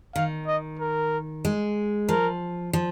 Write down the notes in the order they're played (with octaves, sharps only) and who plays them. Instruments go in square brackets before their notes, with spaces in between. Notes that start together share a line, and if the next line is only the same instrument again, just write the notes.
[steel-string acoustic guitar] D#3 [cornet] F5
[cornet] D#5
A#4
[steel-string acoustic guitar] G#3
[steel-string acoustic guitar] F3 [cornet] A#4
[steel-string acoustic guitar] F3